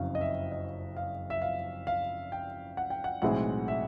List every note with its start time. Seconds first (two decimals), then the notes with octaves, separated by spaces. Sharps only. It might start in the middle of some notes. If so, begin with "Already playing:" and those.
Already playing: F#1 F2 C#3 F#3 F5
0.15 D#5
0.21 E5
0.52 D#5
0.97 F5
1.30 E5
1.42 F5
1.87 F5
2.32 G5
2.77 F#5
2.90 G5
3.04 F#5
3.22 B1 A2 E3 G#3 C4 F#5
3.68 E5